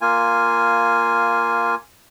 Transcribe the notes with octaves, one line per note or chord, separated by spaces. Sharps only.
A#3 F4 G#5